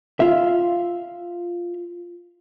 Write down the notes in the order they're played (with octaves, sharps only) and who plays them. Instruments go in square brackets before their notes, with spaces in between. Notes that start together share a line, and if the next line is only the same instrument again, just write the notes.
[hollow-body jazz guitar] F4 E5